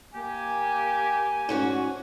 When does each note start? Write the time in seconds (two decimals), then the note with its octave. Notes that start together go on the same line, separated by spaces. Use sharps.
0.14 A#3 G4 G#5
1.49 G#2 C#4 F#4